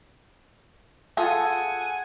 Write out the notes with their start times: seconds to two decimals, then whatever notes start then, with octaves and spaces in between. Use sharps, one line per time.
1.17 F4 G#4 A4 F#5 G#5